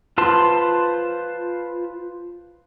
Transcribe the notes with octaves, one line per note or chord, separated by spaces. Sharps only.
F4 B4 C5 A5 C6